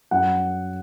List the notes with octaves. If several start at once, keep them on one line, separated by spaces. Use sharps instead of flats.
F#2 F#5